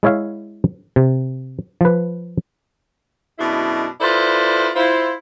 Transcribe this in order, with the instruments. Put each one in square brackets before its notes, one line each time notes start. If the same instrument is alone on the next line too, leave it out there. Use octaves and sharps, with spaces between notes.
[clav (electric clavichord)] G#3 E4 C#5 E5 F5
C3
F3 B4
[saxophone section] F#2 B2 G#3 D4 E4
E4 F4 A4 B4 C5 D5
E4 F4 C5